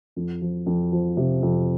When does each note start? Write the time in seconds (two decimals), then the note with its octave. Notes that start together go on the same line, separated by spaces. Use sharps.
0.16 F2
0.41 F3
0.66 F2
0.92 F3
1.17 C3
1.42 F2